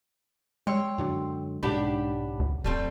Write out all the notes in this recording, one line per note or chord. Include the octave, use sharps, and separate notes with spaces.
G#3 C#5 G5 C6 E6
F#2 D3 F#3
B1 G#2 C#3 D4 G4 F#5 B5
D2
D1 F2 G3 A3 C4